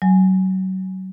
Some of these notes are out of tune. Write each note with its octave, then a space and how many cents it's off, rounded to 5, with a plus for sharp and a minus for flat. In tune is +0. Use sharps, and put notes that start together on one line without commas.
F#3 +30 G#5 +5